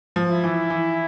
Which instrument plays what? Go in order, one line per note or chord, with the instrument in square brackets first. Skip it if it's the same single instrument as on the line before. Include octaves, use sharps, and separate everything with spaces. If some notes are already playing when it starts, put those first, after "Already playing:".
[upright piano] F3
[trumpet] E4
[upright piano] E3
E3